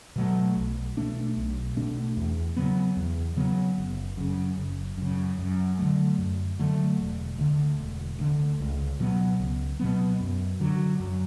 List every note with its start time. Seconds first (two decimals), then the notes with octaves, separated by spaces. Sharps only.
0.16 B2 F#3 A3
0.56 B1
0.97 B2 A3 D4
1.37 B1
1.77 B2 A3 D4
2.17 E2
2.56 C#3 F#3 B3
2.97 E2
3.37 C#3 F#3 B3
3.78 F#1
4.17 F#2 C#3
4.57 F#1
4.97 F#2 C#3
5.39 F#2
5.79 D3 F#3 A3
6.18 F#2
6.59 D3 F#3 A3
6.99 E1
7.38 D2 D3
7.79 E1
8.19 D2 D3
8.60 C#2
9.00 B2 F#3 B3
9.40 C#2
9.80 B2 F#3 B3
10.20 F#2
10.60 D3 F#3
11.00 F#2